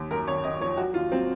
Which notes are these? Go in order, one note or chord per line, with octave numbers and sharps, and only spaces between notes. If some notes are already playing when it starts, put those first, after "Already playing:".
Already playing: D#2
F#2 A#4
G#1 C#5
G#1 D#5
F3 C#5
F#3 F#4
D#2 F4
F#3 C4